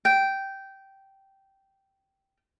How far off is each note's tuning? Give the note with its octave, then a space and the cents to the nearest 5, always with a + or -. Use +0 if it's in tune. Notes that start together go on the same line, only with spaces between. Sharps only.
G5 -10